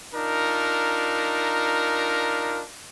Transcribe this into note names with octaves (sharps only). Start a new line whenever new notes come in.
D4 D#4 F4 A#4